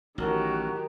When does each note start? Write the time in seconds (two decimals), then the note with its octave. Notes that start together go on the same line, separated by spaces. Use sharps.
0.18 A1 D#3 F#3 F#4 G4 A#4 A5